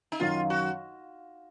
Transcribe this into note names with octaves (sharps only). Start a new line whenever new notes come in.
D#4
F#2 D#3 F#3 F4
F#4